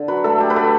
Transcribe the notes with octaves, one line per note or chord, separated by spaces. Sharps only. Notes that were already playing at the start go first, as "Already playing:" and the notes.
Already playing: D3
F#3 B4
A3 A4
A3 G4
B4
A3 A4